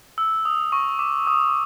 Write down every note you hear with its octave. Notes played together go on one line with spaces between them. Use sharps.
E6
D#6
C#6
D6
D#6